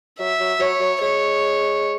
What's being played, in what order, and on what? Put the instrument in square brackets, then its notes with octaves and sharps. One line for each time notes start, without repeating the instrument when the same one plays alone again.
[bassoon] F#3 [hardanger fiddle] E5
[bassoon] F#3
[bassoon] F#3 [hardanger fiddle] C#5
[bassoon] F#3
[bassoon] G#3 [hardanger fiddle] C#5